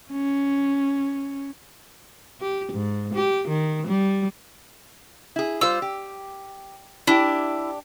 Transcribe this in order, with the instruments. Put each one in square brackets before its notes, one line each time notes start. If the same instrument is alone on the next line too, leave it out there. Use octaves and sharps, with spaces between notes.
[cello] C#4
[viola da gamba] G4
G#2
G4
D#3
G3
[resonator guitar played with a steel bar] E4 G#4
[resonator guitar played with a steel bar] G3 F4 C5 [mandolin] E6
[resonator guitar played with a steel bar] G4
[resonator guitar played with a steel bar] D4 G4 [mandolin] E4